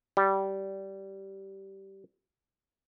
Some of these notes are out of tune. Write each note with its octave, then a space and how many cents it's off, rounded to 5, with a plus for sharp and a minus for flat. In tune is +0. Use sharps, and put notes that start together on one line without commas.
G3 -15